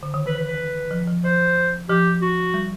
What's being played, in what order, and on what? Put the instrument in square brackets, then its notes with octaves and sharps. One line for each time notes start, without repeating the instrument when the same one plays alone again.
[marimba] D3
D#3
[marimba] E3 [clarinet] B4
[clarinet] B4
B4
[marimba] F3
F3
[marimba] F3 [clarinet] C5
[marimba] F3 [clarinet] G4
[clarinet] F#4
[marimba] G3